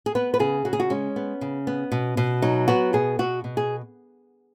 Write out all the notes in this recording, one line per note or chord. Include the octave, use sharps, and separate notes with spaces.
G#4
B3 B4
B4
C#3 G#4
C#3 F#4
G#4
F#4
G#3 C#4
B3
C#3
B3
B2
B2
F#3 D#4
B3 F#4
B2 G#4
B2 F#4
B2
G#4